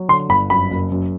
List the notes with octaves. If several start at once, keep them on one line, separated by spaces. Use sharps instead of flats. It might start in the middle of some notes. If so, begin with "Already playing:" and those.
Already playing: F#3
D3 C6
G1 B5
F#2 B5
F#1
F#2